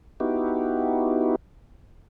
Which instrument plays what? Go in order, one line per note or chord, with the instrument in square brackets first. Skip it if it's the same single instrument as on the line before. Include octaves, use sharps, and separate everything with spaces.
[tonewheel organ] B3 D#4 E4 F#4 G4